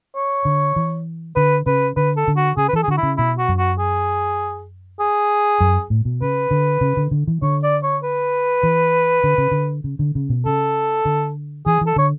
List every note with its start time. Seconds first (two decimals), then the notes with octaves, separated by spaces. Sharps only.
0.16 C#5
0.45 D3
0.76 E3
1.36 D3 B4
1.66 C#3 B4
1.97 D3 B4
2.17 A4
2.28 D3
2.37 F#4
2.57 C#3 G#4
2.68 B4
2.73 E3 A4
2.83 G#4
2.88 D3 F#4
2.97 E4
3.03 C#3
3.17 B2 E4
3.38 F#4
3.49 F#2
3.58 F#4
3.78 G#4
5.00 G#4
5.60 F#2
5.90 A2
6.05 B2
6.21 C#3 B4
6.51 D3
6.81 C#3
6.97 D3
7.11 D3
7.27 E3
7.42 D3 C#5
7.63 D5
7.83 C#5
8.03 B4
8.63 E3
9.24 D3
9.38 C#3
9.51 D3
9.84 C#3
9.99 D3
10.15 C#3
10.30 B2
10.46 C#3 A4
11.05 D3
11.66 E3 G#4
11.81 E3
11.86 A4
11.96 D3 C#5